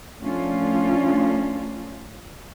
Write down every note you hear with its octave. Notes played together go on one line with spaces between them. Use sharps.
F3 A3 C#4 D4 F4